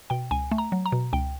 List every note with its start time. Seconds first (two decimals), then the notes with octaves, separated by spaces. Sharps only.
0.10 B2 G5
0.31 C#2 G#5
0.51 A3
0.58 A#5
0.72 F#3
0.86 A#5
0.92 B2
1.13 C#2 G5